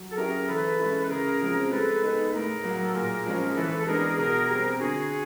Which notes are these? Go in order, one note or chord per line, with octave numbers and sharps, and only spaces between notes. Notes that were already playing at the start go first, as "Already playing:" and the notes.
Already playing: F#3
A4
A#3 C#4 E4 G4 G#4 A#4
E3 A4 B4
G#3 C#4 E4
B4
C#3 G#4 A#4
F3 G#3 C4
G#3 A4 B4
B3 D#4 G#4
A2 G#4 A#4
F#3 A#3
A4
A#2 G#4 A#4
F3 G#3 C#4
E3 A4 B4
A4
G#3 B3 D4 G#4 A#4
B2 G#4 A#4
G3 C4
D3 F#4 G#4